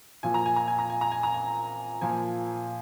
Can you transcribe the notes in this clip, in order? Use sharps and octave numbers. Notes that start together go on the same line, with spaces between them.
A#2 F3 G#5
A#5
G#5
A#5
G#5
A#5
G#5
A#5
G#5
A#5
G#5
A#2 F3 G#5